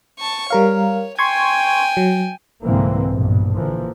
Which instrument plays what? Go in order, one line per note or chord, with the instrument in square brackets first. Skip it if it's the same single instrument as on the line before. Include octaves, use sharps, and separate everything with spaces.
[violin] A5 C#6
[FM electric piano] G3 A#4 F5 [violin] C#5
[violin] G5 G#5 [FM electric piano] C6 C#6 G#6
[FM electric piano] F#3
[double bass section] C2 G#2 D3 E3 A#3 C4
A#1 G2 B2
D3 E3 F3 A#3